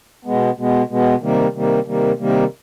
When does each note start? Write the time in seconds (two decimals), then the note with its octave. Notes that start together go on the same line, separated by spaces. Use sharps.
0.25 B2 G#3 B3
0.57 B2 G#3 B3
0.90 B2 G#3 B3
1.21 C3 D#3 G3 A#3
1.54 C3 D#3 G3 A#3
1.86 C3 D#3 G3 A#3
2.19 C3 D#3 G3 A#3